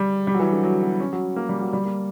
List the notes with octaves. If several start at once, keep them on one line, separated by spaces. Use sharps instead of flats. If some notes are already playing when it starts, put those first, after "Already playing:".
Already playing: G3
G3
F#3
E3
D3
F#3
B3
C#4
F#3
A#3
G3
F#3
G3
A#3